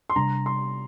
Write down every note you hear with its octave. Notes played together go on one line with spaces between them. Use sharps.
C6
C3 G3 D4 A#5
C6